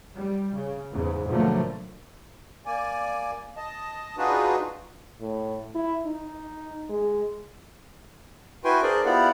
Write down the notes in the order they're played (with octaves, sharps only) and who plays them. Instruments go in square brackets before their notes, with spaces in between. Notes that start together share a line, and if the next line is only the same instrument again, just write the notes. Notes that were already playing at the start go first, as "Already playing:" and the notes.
[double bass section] G3
C#3
E2 G#2 C#3
B2 D3 F3 F#3 A3 A#3
[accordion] A#3 D5 G#5
D#5 A5
D4 D#4 F4 F#4 G#4 B4
[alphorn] A2
E4
D#4
G#3
[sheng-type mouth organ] E4 F#4 B4 G5 G#5 C6
D4 G#4 A#4 C5 D5
B3 E4 F4 G4 D5 F#5